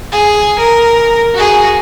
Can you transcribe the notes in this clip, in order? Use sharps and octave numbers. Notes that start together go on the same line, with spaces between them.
G#4
A#4
F#4 G#4